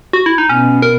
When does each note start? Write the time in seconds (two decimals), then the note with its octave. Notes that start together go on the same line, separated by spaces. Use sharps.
0.13 F#4
0.26 E4
0.38 D#4
0.49 B2 C#4
0.82 A#4